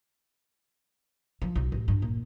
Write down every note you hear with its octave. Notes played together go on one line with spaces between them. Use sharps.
F3
B1
A1
G2
A#2